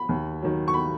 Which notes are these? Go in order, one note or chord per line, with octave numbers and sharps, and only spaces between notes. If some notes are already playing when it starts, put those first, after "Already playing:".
Already playing: B5
D#2
D#3 F#3
C#6
B5